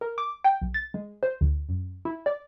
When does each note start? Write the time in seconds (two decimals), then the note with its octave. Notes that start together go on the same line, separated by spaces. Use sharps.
0.01 A#4
0.18 D6
0.44 G5
0.61 B1
0.74 A6
0.94 G#3
1.23 C5
1.41 D2
1.69 F#2
2.05 E4
2.26 D5